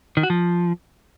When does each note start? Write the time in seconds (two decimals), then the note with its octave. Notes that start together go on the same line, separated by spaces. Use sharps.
0.17 D#3
0.23 F#4
0.30 F3